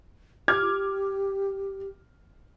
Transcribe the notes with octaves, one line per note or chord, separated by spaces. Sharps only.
G4 D6 F6 G#6